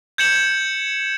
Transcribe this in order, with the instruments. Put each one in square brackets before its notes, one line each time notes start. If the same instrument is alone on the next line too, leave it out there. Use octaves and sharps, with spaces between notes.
[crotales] G6 G#6 C#7 E7 F#7